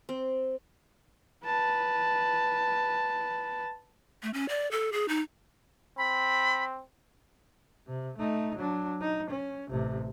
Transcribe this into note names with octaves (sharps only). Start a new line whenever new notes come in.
C4
B4 A5
A3
C#4
D5
A4
G#4
D#4
C4 B5
C3
A3 D#4
F#3 D4
D#4
C#4
A1 C3